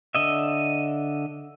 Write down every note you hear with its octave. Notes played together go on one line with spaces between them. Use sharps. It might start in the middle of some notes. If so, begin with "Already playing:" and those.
D3 D#5 E5